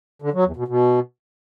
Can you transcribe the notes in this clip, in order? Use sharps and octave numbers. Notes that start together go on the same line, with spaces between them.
D3
F#3
E2
B2
B2